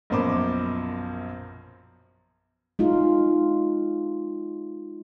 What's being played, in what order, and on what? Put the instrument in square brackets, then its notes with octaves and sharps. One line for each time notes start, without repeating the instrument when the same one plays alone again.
[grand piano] A#1 F#2 B2 C5 B5 D6
[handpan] G#3 D#4 F4